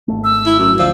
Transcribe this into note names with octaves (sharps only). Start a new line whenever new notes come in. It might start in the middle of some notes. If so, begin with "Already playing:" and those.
G#1 C#2 A3
E6
E4
F#2
D2 F3